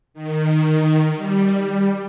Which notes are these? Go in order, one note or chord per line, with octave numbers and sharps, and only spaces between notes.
D#3
G3